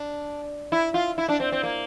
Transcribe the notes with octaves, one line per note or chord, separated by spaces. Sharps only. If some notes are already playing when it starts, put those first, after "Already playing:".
Already playing: D4
E4
F4
E4
D4
C4
C4
A#3